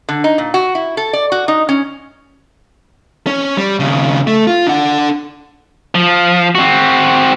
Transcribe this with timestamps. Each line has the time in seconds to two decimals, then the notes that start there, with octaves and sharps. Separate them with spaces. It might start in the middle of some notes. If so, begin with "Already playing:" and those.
0.09 D3
0.24 D#4
0.38 A#2
0.54 F#4
0.75 E4
0.97 A4
1.13 D5
1.32 F#4
1.48 D#4
1.69 C#4
3.27 C#4
3.57 G3
3.80 D#2 C#3
4.27 A3
4.47 F4
4.67 D4 F#5
5.95 F3
6.55 C4 F#4